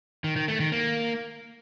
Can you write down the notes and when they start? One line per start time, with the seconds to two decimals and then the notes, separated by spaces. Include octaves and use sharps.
0.24 D#3
0.36 D#3
0.48 A3
0.60 D#3
0.72 A#3